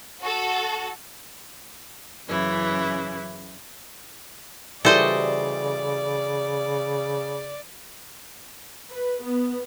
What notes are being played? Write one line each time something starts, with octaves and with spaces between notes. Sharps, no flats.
F#4 A4
F#2 C#3 E3 E4
C#3 E3 G3 F#4 A4 C5 D5 D#5
B4
B3